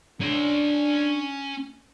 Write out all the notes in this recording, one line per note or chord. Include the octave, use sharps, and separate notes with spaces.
C#4 D4 C6